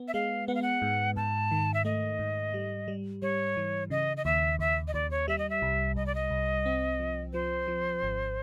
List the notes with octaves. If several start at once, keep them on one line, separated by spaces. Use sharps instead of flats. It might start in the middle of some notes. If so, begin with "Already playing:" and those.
Already playing: B3
E5
G#3 F5
B3 F#5
F5
F#5
G#2
G#2 A5
D#3
E5
A3 D#5
G#2
G3
G3
G3 C#5
E3
C#3 D#5
D#5
D#2 E5
D#2 E5
D#5
D#2 D5
C#5
G3 E5
D#5
E5
C2
C2 D#5
D5
D#5
C2
C4
F3
F3 C5
F3
G#1